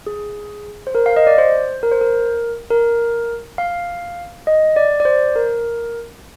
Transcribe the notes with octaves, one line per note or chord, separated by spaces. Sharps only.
G#4
C5
A#4
F5
D#5
D5
C5
A#4
C5
A#4
A#4
F5
D#5
D5
D5
C5
A#4